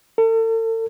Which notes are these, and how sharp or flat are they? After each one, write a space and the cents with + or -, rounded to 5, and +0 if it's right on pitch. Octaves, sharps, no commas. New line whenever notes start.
A4 +40